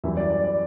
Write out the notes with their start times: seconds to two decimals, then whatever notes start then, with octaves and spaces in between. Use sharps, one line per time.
0.04 F#2 E3 G3 E5
0.17 D5
0.30 D5
0.44 D5